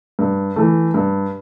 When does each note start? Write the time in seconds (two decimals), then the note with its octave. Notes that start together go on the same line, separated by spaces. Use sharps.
0.19 G2
0.56 E3 A3
0.94 G2